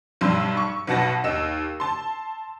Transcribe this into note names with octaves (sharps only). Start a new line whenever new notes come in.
B1 G2 G3 C6 E6
C#6
B1 B2 F#5 A5 A#6
D#2 D#4 E6 E7
A5 C6